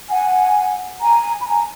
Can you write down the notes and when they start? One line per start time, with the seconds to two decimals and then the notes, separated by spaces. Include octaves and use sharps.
0.10 F#5 G#5
1.01 G#5 A#5
1.41 B5
1.46 G#5 A#5